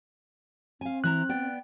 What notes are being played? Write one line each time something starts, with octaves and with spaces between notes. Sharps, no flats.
C4 F5 G#5
E3 E4 A#5 F#6
B3 D5 G5